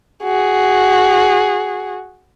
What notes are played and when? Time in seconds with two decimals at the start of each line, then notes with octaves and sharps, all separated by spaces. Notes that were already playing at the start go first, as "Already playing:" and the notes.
0.24 F#4 G#4